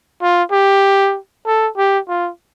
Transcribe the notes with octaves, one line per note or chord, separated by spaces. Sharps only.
F4
G4
A4
G4
F4